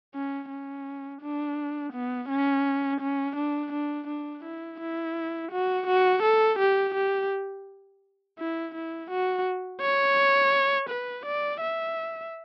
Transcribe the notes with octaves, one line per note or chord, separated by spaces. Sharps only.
C#4
C#4
D4
B3
C#4
C#4
D4
D4
D4
E4
E4
F#4
F#4
A4
G4
G4
E4
E4
F#4
C#5
B4
D5
E5